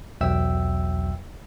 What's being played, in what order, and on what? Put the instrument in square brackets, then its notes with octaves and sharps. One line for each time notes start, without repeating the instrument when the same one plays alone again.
[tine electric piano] B1 E2 F#3 E5 G5 E6